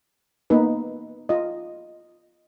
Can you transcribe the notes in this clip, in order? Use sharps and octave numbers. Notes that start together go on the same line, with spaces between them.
A#3 B3 D#4 B4
F4 D#5